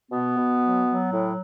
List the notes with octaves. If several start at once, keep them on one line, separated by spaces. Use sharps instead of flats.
B2 B3
B2
F#3
F#3
A2